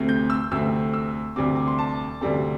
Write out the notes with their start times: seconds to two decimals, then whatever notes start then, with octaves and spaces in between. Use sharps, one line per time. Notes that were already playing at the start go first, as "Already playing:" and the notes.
Already playing: D2 C3 A3 C4
0.09 G6
0.30 E6
0.51 D2 C3 A3 C4 E6
0.94 E6
1.36 D2 C3 G3 C4 D6
1.56 D6
1.67 C6
1.79 A5
2.21 D2 C3 G3 C4 A4